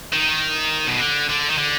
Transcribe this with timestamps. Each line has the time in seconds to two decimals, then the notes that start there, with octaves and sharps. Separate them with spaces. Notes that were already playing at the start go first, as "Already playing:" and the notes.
0.13 D#3
0.88 B2
1.00 D3
1.29 D3
1.50 D#3
1.58 D3